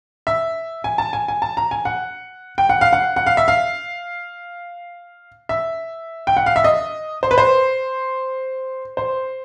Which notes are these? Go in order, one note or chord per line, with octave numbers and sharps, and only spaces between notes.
E5
G#5
A5
G#5
G#5
A5
A#5
G#5
F#5
G5
F#5
F5
F#5
F#5
F5
E5
F5
E5
G5
F#5
F5
E5
D#5
C5
B4
C5
C5